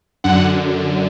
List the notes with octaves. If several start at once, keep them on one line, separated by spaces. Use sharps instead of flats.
F#2 D3 F#5